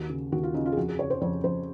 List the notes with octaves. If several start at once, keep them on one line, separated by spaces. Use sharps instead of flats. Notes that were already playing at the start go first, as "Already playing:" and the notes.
Already playing: D#2 F#4
C#3
D#2 F#4
F4
C#3 D#4
F4
G#4
F2 F#4
G#4
C#3 C#5
C5
F2 C#5
F2 C5